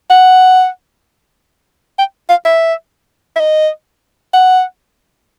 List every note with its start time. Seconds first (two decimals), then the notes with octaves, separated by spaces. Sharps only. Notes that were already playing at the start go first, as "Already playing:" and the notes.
0.10 F#5
1.98 G5
2.29 F5
2.45 E5
3.36 E5
3.40 D#5
4.33 F#5